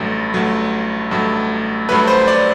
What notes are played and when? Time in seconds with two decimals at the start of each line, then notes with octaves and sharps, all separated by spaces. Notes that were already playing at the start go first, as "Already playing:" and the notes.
Already playing: A1 G2 F#3 A3
0.34 A1 G2 F#3 A3
1.11 A1 G2 F#3 A3
1.89 A1 G2 F#3 A3 B4
2.07 C5
2.28 D5